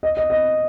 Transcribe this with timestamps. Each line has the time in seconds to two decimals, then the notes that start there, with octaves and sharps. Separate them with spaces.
0.03 D#5
0.17 D#5
0.30 D#5